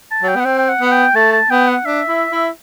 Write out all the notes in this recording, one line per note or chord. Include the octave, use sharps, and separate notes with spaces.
A5
F#3
G5
B3 F#5
C4 G5
G5
F#5
B3
G5
A3 A5
A5
B3 G5
F#5
D4 E5
E4
E4